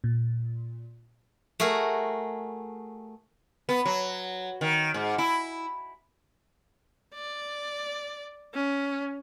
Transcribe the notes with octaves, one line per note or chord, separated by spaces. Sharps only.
A#2
A3 F#4 G#4 A#4
B3
F#3
D#3
G#2
E4
D5
C#4